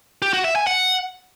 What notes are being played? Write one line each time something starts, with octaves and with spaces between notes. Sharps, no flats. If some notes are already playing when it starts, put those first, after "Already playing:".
G4
F#4
E5
G#5
F#5